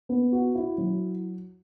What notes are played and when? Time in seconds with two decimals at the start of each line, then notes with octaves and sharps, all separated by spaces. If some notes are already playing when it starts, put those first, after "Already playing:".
0.09 B3
0.32 F#4
0.55 E4
0.78 F#3